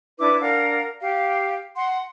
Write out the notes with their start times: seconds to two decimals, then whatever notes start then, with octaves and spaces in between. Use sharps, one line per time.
0.19 D4 E4 B4 D6
0.41 D4 A#4 F5 F#5
1.00 G4 F5
1.76 F#5 C6